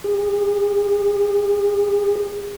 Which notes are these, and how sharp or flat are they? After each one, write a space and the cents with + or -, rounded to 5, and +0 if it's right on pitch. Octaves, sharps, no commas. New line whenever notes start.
G#4 -40